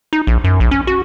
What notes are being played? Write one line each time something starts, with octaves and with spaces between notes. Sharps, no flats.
D#4
A#1
F#2
A#1
C#4
F#4